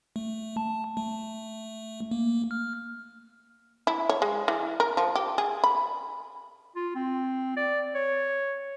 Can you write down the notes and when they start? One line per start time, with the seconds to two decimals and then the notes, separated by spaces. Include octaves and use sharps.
0.16 A3
0.57 A5
0.97 A3
1.35 A3
2.11 A#3
2.51 F6
3.87 E4
4.09 C#5
4.22 G#3
4.48 E3
4.80 A#4
4.97 F3
5.15 G4
5.38 G#4
5.64 B5
6.76 F4
6.95 C4
7.57 D5
7.95 C#5